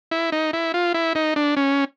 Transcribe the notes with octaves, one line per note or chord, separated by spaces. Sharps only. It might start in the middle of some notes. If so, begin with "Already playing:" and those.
E4
D#4
E4
F4
E4
D#4
D4
C#4